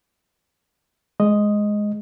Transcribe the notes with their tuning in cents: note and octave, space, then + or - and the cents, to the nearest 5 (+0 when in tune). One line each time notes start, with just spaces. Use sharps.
G#3 +10 D#5 +0